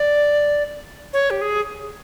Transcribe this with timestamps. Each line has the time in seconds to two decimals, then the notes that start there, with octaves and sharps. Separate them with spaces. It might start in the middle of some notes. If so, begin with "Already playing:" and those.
Already playing: D5
1.13 C#5
1.30 G4
1.41 G#4